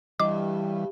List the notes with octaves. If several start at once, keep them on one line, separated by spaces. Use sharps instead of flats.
G2 E3 G3 D#5 D6